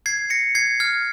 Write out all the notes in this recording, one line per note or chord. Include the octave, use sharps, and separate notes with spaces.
G#6 C7
A#6 C#7
G#6 C7
F6 G#6